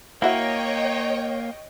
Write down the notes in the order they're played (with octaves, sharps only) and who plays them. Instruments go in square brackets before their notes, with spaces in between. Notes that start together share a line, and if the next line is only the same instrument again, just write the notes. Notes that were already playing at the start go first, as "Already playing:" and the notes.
[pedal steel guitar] A#3 [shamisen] E4 F#4 E5 [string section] C#5 D#5 G5